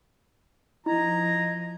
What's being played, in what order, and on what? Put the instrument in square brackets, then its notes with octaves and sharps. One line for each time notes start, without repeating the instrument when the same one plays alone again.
[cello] F3 [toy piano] E4 [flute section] D#5 G#6 [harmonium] A#5